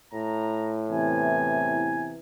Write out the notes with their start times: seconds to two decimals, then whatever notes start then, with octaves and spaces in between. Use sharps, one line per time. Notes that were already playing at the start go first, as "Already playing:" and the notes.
0.13 A2 A#5
0.90 E2 C3 E3 G#5